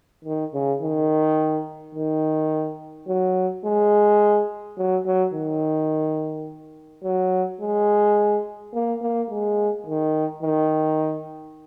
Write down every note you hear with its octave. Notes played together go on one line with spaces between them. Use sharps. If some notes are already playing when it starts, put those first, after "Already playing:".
D#3
C#3
D#3
D#3
F#3
G#3
F#3
F#3
D#3
F#3
G#3
A#3
A#3
G#3
D#3
D#3